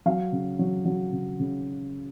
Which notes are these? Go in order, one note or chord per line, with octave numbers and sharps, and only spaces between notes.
F#3 F5
C#3
F#3
F#3
C#3
C#3